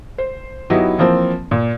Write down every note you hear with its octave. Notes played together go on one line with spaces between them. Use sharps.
C5
F#3 B3 D#4 E4 G4
E3 F3 A#3 C4
A#2